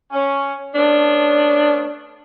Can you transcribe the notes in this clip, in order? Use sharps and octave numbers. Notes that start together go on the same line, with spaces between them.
C#4
A3 B3 C#4 D4